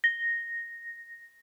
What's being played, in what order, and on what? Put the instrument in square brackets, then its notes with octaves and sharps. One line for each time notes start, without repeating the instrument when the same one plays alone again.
[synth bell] A#6